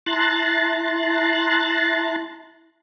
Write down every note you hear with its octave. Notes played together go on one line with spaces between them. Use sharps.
E4 A5 A#5 C6 F#6 A6